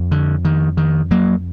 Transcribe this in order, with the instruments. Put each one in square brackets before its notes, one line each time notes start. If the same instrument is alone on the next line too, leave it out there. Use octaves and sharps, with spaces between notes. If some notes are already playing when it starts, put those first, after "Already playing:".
Already playing: [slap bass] F2
D3
D#3
D#3
F#3 A#3